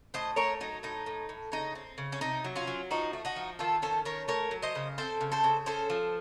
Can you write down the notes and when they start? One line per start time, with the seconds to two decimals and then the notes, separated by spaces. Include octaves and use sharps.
0.14 A2 C5 D#5
0.36 A3 A#4 C#5
0.60 F#3 D#4
0.83 A2 D#4
1.06 A2
1.29 A2
1.52 C#3 D#4
1.75 C4
1.98 C#3
2.12 C#4
2.21 C3 D#4
2.44 F#3
2.56 C#4 F4
2.67 F#3
2.91 F3 D#4 F#4
3.13 A3
3.25 D#4 F#4
3.36 F3
3.59 D#3 F4 A4
3.82 C#4 A4 C5
4.05 D#3 A#4 C#5
4.28 A3 A#4 C#5
4.51 F#3
4.62 C5 D#5
4.75 C#3
4.98 C4 A4 C5
5.21 C#3
5.32 A4 C5
5.44 C#3
5.66 C#4 A4 C5
5.90 F3